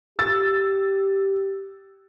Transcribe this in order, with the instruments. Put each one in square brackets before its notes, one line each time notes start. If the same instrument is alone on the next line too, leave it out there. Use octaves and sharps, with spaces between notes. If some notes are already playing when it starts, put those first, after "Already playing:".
[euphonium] G4 [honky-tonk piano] E6 A6